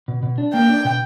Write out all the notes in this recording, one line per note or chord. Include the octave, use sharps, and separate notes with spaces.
B2
B2
D4
A#3 G5
D4
B2